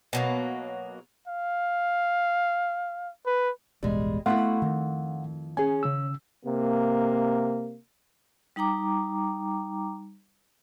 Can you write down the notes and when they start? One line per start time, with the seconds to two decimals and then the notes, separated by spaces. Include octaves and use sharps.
0.13 B2 F#3 A#3
1.28 F5
3.27 B4
3.83 E1 A1 B2 G3 G#3
4.26 A3 B3 E4 F#4 F5 F#5 C6
4.62 F2 D#3
5.57 C#4 G#4 G#5
5.83 C#3 E6
6.46 C3 A#3
8.56 G3 D#4 G5 A#5 D6